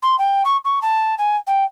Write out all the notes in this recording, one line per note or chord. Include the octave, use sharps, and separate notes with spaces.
C6
G5
C#6
C#6
A5
G#5
G5